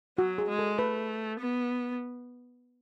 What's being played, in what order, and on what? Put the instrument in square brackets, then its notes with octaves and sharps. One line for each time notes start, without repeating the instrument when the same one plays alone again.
[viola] F#3 [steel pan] F#4
[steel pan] G#4
[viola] G#3
[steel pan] A4
[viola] A3 [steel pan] B4
[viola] B3